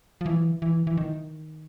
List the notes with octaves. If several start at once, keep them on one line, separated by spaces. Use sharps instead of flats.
F3
E3
E3
E3
D#3